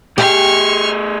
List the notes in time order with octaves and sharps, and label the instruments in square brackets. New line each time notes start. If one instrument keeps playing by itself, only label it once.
[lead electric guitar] A3 G#4 [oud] G4 [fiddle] C#6 F6